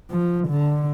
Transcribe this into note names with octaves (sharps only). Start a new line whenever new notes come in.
F3
D3